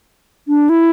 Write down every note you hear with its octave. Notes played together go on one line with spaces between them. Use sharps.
D4
E4